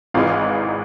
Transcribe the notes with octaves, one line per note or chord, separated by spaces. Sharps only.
G#1 G#2 E3 G#3 F4 F5